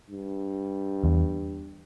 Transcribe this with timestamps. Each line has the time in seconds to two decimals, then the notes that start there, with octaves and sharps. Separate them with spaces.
0.10 G2
1.04 E2